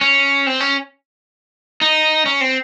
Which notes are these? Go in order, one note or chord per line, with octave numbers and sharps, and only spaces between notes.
C#4
C4
C#4
D#4
C#4
C4